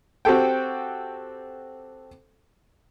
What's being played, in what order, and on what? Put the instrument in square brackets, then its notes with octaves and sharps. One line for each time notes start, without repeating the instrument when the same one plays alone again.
[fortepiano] C4 F#4 G4 A4 G5